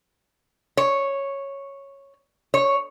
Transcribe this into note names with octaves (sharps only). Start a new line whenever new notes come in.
C#5
C#5